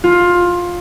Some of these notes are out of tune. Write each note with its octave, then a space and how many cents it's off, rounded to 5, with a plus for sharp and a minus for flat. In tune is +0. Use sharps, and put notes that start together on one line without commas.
F4 +15